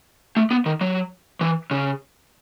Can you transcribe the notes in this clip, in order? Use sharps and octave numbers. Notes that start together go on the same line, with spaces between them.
A3
B3
D#3
F#3
E3
C#3